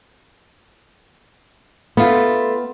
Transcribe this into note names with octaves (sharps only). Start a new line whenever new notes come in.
A3 B3 F4